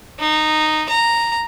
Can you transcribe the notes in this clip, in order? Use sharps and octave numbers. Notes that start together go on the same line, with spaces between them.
D#4
A#5